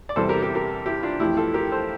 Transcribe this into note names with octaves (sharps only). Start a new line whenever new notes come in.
D5
E2 C3 G3 A4 C5
G4 A#4
G4 A#4
G4 A#4
E4 G4
D4 F4
F2 E3 A3 E4 G4
F4 A4
G4 A#4
A4 C5